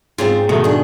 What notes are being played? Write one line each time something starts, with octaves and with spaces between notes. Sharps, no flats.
G#2 C4 C#4 F4
B2 D#3 A3
D4 G#4